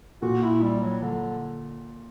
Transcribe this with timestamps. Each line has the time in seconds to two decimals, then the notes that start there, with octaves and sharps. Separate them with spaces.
0.22 A#2 F#4
0.43 E4
0.62 G3
0.83 F#3
1.03 D3